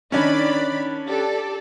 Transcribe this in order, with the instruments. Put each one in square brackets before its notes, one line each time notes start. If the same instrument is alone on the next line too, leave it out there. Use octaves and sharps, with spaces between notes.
[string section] D#3 D5 B5 [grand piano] C#4 D4
[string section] G4 A4 D5